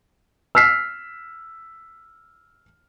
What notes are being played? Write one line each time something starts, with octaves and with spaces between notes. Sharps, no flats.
E6 F6 B6 C7